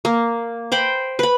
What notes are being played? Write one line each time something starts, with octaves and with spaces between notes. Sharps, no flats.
A#3
C5 G5 B5
B4 B5